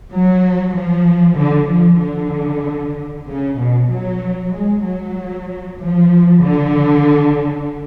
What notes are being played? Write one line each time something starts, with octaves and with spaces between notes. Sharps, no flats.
F#3
F3
D3
F3
D3
C#3
B2
F#3
G#3
F#3
F3
D3